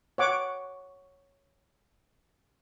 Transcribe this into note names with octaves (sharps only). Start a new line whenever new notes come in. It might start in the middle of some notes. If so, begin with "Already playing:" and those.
C#5 F#5 D6